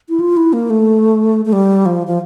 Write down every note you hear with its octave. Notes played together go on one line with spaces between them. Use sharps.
E4
F4
E4
A#3
A3
A3
G3
F3
F3